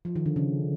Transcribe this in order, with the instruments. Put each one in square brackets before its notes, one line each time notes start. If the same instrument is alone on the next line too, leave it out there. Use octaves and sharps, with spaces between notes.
[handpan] F3
D#3
D3
C#3